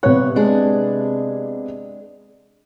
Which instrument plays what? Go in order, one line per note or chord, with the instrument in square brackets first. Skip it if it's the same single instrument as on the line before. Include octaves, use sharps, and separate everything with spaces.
[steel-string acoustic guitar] G2 C#5 [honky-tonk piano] C3 B3 F#6
[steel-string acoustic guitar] G#3 D4 G#4